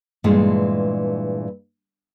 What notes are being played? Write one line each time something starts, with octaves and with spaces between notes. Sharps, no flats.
G2 A#2 E3 G#3 A3